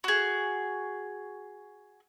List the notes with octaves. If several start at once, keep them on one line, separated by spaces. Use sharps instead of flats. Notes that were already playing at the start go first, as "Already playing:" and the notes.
F#4 G#4